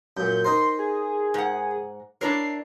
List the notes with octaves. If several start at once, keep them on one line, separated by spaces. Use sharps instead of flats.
F#2 A#2 G6
D#4 A#4 C5 C6
G#4
G#2 F#5
D4 E4 A#4 C#5 C7